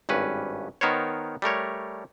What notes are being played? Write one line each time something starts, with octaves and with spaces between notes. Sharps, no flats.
G#1 G2 C#4 B4
D#3 B3 A#4 C5 C#5
G3 A3 A#4 C#5